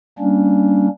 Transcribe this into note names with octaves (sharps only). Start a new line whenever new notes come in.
G3 A#3 C#4 D4